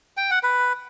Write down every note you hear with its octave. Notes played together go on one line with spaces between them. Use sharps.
G5
F#5
B4